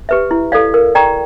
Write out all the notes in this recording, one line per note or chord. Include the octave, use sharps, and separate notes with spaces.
G4 B4 E5
E4
A4 D5 F5
A#4
D5 G5 A#5 C#6